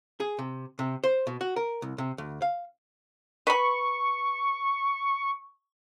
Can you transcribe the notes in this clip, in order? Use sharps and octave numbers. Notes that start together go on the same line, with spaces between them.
G#4
C3
C3
C5
B2
F#4
A#4
C2
C3
D2
F5
B4 B5 C#6